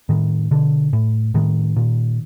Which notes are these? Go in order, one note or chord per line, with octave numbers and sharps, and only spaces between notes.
A2 D#3
B2 D3
A2
A2 D#3
A#2